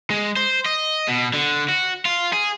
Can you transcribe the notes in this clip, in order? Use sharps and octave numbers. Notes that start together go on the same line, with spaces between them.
G#3
C5
D#5
B2
D3
F#4
F4
G#4